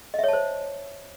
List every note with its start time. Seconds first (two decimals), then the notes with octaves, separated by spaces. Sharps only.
0.14 D#5
0.19 E5
0.24 C#5
0.28 A5
0.33 C5